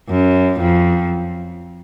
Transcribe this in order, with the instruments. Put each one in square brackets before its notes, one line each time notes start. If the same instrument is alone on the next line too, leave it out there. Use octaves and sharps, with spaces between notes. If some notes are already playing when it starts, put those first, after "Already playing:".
[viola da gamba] F#2
F2